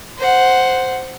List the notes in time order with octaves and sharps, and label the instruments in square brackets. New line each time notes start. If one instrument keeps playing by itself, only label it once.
[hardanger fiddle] C5 F#5